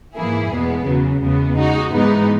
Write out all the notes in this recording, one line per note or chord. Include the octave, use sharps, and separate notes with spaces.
G#2 E3 A#3 E4 G#4
E2 B2 G#3 B3
E2 C#3 F#3
E2 C#3 G#3 B3
G#3 D#4 F#4
G#2 E3 G#3 B3 D#4